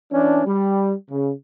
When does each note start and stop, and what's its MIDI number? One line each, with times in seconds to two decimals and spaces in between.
0.12 0.45 52
0.12 0.45 61
0.12 0.45 62
0.45 0.93 55
1.10 1.32 49